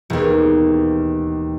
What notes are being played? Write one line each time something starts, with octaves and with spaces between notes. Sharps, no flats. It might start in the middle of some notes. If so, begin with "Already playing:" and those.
E1 D#2